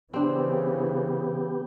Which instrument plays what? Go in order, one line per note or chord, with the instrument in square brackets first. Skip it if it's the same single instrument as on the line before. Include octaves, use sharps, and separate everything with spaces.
[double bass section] C#3 E3 [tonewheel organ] B3 G4 [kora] C4 D4